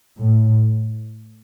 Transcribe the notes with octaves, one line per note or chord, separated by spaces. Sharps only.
A2